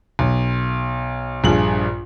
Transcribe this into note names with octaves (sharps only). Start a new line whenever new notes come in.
B1
A#1 G2 G#4 F#7